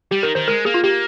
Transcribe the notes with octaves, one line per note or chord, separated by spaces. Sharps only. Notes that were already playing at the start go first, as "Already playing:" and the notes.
G3 G4
D#3 A#4
D#3 C5
G#3 A#4
A#3 G#4
F4
A#3 G4